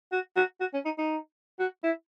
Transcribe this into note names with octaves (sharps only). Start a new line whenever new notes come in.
F#4
F#4
F#4
C#4
D#4
D#4
F#4
E4